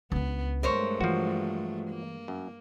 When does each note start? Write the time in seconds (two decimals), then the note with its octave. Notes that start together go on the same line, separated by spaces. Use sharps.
0.12 C#2 B3 D4
0.63 G2 G#3 A3 A#4 C5 C#5
1.01 E3 F3 F#4
1.90 A#3
2.28 F#2